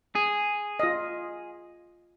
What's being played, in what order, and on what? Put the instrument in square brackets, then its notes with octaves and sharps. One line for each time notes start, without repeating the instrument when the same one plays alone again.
[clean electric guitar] G#4
[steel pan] F4 D#5